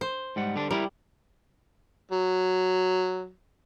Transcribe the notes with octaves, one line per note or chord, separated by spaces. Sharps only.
C5
G#2 G3 F#5
D3 G3 D4
G3 E4 G4 A#4
F#3